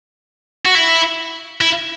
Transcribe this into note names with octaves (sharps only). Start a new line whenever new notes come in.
F#4
E4
E4